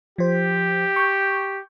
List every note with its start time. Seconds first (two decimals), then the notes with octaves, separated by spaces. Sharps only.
0.18 F3 G4 C5
0.96 C#6 G6